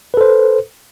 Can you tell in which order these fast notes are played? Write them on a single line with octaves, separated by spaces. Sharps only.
B4 A4 C5